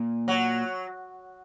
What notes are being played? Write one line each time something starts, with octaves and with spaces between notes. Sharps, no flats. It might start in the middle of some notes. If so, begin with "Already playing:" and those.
Already playing: A#2
F#3